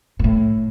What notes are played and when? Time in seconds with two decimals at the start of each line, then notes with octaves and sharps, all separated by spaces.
0.19 A#2
0.24 A2